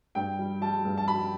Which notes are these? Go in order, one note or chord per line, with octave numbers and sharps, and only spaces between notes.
G2 G5
G3
G3 A5
G2
A5
G3 B5